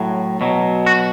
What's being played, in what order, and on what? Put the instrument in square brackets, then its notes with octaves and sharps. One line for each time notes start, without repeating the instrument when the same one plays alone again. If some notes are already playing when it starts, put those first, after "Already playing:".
Already playing: [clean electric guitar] A2 F#3
B2 F#3
F#4